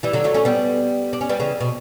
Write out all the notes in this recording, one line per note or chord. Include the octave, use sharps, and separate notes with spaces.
E3 G3
D3 F#3
F#3 A3
A3 C#4
G3 B3
D4
C#4
G3 B3
C#3 E3
B2